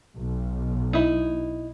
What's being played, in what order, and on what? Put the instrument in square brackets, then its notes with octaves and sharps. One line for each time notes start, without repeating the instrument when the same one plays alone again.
[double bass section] B1
[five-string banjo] D#4 E4